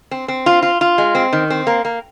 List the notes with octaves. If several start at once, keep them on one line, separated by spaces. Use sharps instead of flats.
C4
C4
F4
F4
F4
G#3
C4
D#3
C4
A#3
A#3